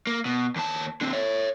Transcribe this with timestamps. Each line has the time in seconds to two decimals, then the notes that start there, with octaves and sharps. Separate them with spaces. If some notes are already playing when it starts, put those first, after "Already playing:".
0.07 A#3
0.25 B2
0.56 D#2 A5
1.01 D3 C4
1.13 C#5 E5